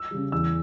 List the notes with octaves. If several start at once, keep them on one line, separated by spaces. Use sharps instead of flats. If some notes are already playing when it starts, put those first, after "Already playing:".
Already playing: E6
C#3 G3
E2 E6